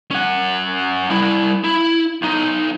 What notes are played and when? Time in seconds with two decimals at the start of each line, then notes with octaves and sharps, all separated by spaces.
0.11 C#4 F#5
1.10 G3 E4
1.64 E4
2.22 B1 D#4